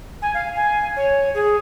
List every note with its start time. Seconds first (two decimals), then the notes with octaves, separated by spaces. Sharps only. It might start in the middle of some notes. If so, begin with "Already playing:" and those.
0.22 G#5
0.34 F5
0.55 G#5
0.96 C#5
1.34 G#4